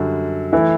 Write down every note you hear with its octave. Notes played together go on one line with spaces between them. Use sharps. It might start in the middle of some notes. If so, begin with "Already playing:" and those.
Already playing: F#2 D3 G3
E3 A3 E4